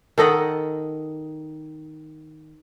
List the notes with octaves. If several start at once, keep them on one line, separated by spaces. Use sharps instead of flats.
D#3 A4 D#5 F#5